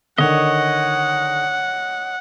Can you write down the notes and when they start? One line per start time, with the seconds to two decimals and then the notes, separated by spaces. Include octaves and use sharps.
0.18 D3 D#3 C#5 D#5 F#5